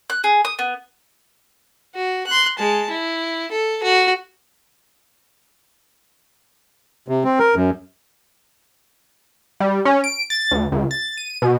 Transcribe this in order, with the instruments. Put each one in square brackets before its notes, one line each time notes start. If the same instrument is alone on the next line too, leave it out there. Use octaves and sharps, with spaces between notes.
[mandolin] F#6
G#4
D#6
B3
[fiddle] F#4
C6 F#6
G#3 A5
E4
A4
F#4
[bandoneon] C3
C4
A#4
F#2
[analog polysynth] G3
C#4
D7
A6
D2
C#2
A6
D#7
B2